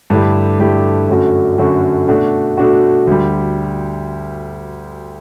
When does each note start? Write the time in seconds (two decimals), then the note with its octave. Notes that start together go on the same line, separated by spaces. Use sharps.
0.10 G2 D3 A3 E4 G4
0.59 G2 D3 A3 E4 G4
1.09 F#2 D3 A3 C#4 F#4
1.58 F#2 D3 A3 C#4 F#4
2.08 B2 A3 D4 F#4
2.57 B2 A3 D4 F#4
3.07 D2 D3 G3